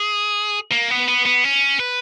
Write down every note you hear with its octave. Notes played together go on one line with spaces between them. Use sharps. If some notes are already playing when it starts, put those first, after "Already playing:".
Already playing: G#4
A#3
B3
B3
B3
C#4
B4